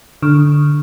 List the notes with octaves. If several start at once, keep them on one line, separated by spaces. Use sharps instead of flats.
D3